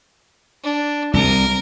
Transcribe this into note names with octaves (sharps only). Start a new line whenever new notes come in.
D4
C2 C3 A#4